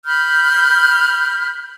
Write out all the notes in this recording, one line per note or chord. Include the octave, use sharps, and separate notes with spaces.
B5 F6 G6